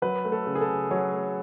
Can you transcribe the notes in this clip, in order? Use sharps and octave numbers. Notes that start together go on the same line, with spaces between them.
F#3 B4
A3
A4
C#3
G#4
A4
C#3
F#3 C#5
A3